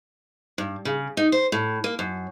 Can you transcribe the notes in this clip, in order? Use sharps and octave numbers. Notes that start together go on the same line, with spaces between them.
G2
C#3
D#4
C5
A2
A#3
F#2